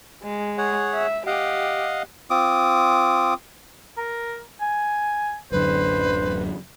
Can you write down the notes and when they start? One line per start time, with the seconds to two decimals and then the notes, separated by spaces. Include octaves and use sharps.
0.24 G#3
0.58 G#4 C#5 F#5
0.94 E5
1.27 G4 D#5 F5 F#5
2.30 C4 F4 D6 D#6
3.98 A#4
4.61 G#5
5.52 D1 F#2 D3 B4 C5